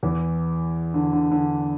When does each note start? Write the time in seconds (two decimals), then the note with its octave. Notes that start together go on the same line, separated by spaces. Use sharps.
0.03 E2 E3
0.94 D3
1.13 D3
1.32 D3